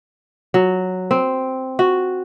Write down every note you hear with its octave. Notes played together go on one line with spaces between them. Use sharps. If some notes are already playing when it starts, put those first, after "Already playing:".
F#3
C4
F#4